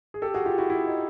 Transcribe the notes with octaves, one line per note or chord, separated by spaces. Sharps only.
G#4
G4 A4
F#4 G#4
F4 G4
E4 F#4
E4
D#4